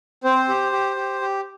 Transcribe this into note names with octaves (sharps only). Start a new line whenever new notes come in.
C4 C5
G4
G4
G4
G4